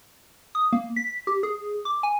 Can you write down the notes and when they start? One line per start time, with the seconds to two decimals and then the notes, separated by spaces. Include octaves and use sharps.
0.55 D#6
0.73 A#3
0.96 B6
1.27 G4
1.43 G#4
1.85 D6
2.03 G#5